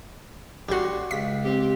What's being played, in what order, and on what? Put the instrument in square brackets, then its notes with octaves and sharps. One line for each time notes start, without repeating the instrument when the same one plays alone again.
[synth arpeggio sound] A1 F#4 [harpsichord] G3 C6
[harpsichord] C#2 [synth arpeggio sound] B6
[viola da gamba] C4 G4